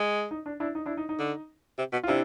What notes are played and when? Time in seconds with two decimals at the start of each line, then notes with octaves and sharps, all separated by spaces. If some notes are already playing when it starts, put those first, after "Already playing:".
Already playing: G#3
0.31 D#4
0.46 D4
0.60 D4 E4
0.75 D#4
0.86 D4 E4
0.97 D#4
1.09 D#4
1.19 D3
1.78 C3
1.93 B2
2.03 F4
2.08 C3 D4 E4